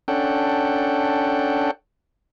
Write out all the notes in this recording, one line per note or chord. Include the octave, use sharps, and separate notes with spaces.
C#4 D4 A4 F#5 G5